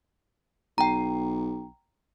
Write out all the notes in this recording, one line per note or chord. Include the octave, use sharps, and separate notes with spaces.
B1 G5 A#5